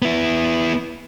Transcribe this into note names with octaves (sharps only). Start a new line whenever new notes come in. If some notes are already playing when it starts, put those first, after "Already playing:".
B3 E4